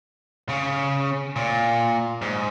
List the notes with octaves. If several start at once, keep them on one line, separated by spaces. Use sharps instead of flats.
C#3
A#2
G#2